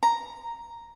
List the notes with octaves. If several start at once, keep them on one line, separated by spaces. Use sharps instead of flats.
A#5